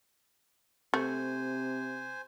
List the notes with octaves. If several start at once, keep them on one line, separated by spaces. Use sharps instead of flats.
C3 A3 C5 G#5